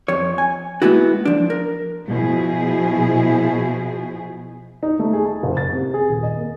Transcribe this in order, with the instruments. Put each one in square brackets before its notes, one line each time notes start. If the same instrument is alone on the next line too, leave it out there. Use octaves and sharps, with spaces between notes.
[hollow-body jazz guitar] F2 C#5
G#5
G#3 A#3 B3 E4 F#4
F3 D4
A#4
[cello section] B2 F3 E4 G#4
[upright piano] D#4
A3
G#4
A5
F#1
A6
C3
G#4
D#1
D#5
A#3